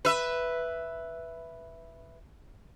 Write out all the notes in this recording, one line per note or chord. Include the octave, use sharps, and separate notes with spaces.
B4 E5